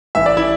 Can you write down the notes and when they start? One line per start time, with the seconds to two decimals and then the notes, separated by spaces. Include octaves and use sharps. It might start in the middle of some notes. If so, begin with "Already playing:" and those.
0.15 A1 A2 E3 E5
0.26 D5
0.37 E4